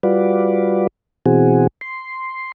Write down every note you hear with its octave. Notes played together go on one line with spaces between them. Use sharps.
G3 F4 F#4 B4 D5
B2 E3 C4 F#4 G#4
C6